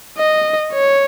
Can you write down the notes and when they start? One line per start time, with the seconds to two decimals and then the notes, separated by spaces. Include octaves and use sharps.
0.18 D#5
0.73 C#5